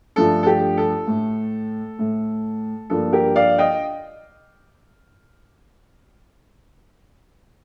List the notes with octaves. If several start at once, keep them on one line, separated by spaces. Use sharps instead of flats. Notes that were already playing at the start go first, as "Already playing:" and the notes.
G2 F3 A3 A4
A4
G4
A4
A2 A3
A2 A3
G2 F3 A#3 A4
G4 A#4
D5 F5
D#5 G5